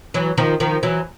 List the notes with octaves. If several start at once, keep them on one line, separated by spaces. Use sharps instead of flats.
E3 F#3
D#3 F3
D#3 F3
E3 F#3